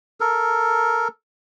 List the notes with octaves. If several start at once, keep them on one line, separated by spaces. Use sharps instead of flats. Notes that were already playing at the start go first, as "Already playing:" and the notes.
A4 A#4